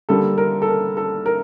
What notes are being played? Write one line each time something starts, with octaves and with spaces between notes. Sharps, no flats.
D3 G3 A#3 A4
A#4
A4
A#4
A4
A#4